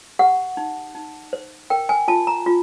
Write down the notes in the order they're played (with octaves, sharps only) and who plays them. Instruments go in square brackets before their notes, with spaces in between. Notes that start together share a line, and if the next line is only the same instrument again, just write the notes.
[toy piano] G4 F#5
D#4
D#4
C5
A#4 G5
G#5
F4 A5
A#5
F4